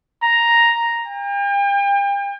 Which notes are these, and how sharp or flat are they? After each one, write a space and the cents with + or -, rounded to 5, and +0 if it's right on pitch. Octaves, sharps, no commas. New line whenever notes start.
A#5 +5
G5 +40